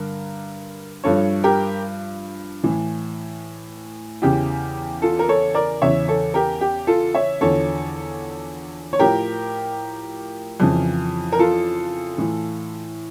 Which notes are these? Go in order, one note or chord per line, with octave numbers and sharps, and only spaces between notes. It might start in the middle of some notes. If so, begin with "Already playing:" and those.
Already playing: G2 D3 A#4
G2 F3 A4 C#5
G4 A#4
A2 E3
E2 C#3 E3 G4
F4 A4
A#4
A4 C#5
A#4 D5
E2 C#3 E3 C#5 E5
A4 C#5
G4 A#4
G4
F4 A4
C#5 E5
E2 D3 F3 A4 C#5
C#5
A2 F3 G4 A#4
F2 C#3 E3
A#4
F4 A4
A2 E3